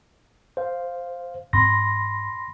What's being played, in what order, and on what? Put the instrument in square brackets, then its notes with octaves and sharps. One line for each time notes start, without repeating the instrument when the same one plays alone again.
[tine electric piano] C5 F5
[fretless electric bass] G#2 C4 [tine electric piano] B5 C6 A#6